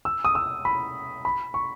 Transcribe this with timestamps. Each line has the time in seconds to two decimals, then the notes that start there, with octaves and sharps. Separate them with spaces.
0.05 E6
0.25 D#6
0.35 E6
0.65 B5
1.25 B5
1.54 C#6